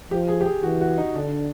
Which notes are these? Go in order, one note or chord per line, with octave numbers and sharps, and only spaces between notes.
F3 G4
G#4
G4
G#4
E3 F#4
F#4
D#4
D3 D4